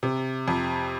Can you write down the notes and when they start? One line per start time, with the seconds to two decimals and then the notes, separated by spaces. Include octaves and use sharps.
0.03 C3
0.48 F2